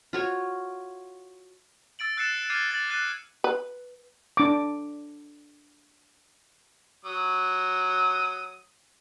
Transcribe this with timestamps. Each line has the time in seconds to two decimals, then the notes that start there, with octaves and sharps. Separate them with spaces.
0.13 F4 F#4 C#5
1.99 E6 A6 D7 F#7
2.17 E6 F#6 A6 C7 C#7 E7
2.29 C#7
2.50 D6 F6 G#6 C7 D#7
2.71 A6 F#7
2.90 F#6 A6 C7 D#7
3.44 B4
4.37 D4 D6
7.05 F#3 D#6